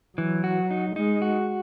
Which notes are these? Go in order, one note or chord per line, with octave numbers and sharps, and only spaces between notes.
E3 F#3
F#4
D#4
G#3 D#4
F#4